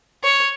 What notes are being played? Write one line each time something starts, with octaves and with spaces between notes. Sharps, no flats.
C#5